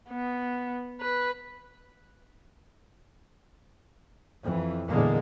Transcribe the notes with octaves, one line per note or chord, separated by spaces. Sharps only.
B3
B4
F2 E3
E2 A#2 D3 E3 G#3 A#3